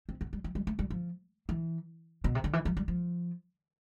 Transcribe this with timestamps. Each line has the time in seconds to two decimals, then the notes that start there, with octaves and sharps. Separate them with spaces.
0.09 C4
0.21 B3
0.33 G3
0.44 F3
0.55 G3
0.67 A3
0.79 G3
0.90 F3
1.49 E3
2.24 B2
2.35 C3
2.44 D3
2.53 E3
2.65 F3
2.77 G3
2.88 F3